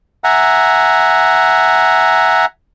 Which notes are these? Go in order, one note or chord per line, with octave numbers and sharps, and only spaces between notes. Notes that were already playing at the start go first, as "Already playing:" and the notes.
E5 F#5 G#5 A#5